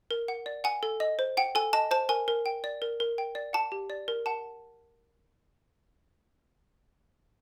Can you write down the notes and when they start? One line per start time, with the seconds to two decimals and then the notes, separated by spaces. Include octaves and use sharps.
0.11 A#4
0.28 F#5
0.46 D5
0.64 F#5 G#5
0.83 A4
1.00 D#5
1.19 C5
1.37 F#5 G5
1.55 A4 G#5
1.73 D#5 A5
1.91 C5 A5
2.09 A#4 G#5
2.28 A#4
2.46 G5
2.64 D5
2.82 A#4
3.00 A#4
3.18 G5
3.35 D5
3.53 F#5 A5
3.72 G4
3.90 D5
4.08 A#4
4.26 F#5 A5